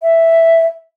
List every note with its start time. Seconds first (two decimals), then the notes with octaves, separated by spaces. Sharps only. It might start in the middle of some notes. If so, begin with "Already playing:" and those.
0.02 E5